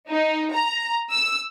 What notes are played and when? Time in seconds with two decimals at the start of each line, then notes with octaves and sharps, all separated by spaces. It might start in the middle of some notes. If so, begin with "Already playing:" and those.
0.10 D#4
0.53 A#5
1.11 E6